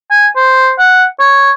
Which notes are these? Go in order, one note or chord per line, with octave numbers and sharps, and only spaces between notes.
G#5
C5
F#5
C#5